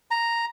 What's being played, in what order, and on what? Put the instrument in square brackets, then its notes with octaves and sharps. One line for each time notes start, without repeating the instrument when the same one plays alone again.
[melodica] A#5